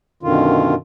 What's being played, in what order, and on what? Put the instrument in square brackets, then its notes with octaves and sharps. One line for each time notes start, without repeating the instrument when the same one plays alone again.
[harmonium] F#2 B2 D3 D#3 F4